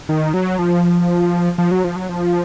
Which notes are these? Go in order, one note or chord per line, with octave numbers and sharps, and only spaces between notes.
D#3
F#3
F3
F3
F#3
F3
F#3
F3